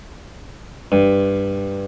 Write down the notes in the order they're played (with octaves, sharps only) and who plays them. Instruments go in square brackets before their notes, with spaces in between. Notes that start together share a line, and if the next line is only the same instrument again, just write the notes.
[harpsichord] G2